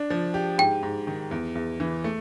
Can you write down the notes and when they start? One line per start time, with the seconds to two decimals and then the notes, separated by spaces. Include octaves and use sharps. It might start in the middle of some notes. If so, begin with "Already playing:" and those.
Already playing: D4
0.10 F3
0.34 G4
0.58 G#2 G5
0.83 G#2
1.07 D#3
1.31 E2
1.55 E2
1.80 E3
2.04 A3